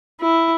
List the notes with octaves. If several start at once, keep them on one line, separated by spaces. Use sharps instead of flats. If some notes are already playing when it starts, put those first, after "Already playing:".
E4